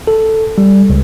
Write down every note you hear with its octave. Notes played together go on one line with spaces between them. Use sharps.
A4
G3
C#2